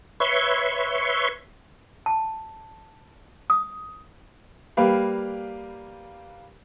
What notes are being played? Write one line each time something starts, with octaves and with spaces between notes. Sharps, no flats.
B4 C#5 E5 C6 C#6
A5
D#6
G3 A#3 G4 B4 F5